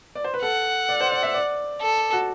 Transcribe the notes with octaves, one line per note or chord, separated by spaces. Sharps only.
D5
C5
B4
A4 F#5
D5
C5
D5
E5
D5
A4
F#4